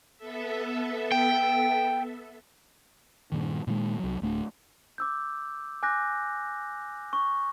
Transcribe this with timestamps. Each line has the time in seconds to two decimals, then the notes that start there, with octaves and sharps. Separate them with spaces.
0.17 B3 A4 E5
1.12 G5
3.32 G2 A#2 D#3
3.67 A#2 D#3 E3 G#3
3.99 C2 F#3
4.22 D1 A3 D4
4.98 D6 E6 G6
5.83 G#5 D6 F#6 G6 A#6
7.13 C#6